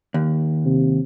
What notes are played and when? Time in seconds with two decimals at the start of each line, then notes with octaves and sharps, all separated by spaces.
0.14 D#2
0.65 C3